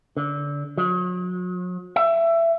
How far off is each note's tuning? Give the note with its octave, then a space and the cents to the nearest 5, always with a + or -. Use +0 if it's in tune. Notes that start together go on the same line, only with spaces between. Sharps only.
D3 -25
F#3 -40
E5 +20